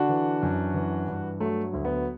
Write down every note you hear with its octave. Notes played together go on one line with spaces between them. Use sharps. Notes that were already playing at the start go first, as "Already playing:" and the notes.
Already playing: D3 D4 F#4
E3
F#2
E3
G2
F#3 A3
D2
B3